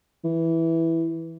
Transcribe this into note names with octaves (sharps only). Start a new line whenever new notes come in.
E3